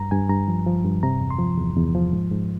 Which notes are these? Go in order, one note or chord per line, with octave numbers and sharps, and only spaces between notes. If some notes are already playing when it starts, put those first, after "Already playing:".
Already playing: G2 A#5
G2 G#5
G2 A#5
F3
F3
G2
C3 A#5
E2
C6
F3
E2
E2
F3
G#2
G#2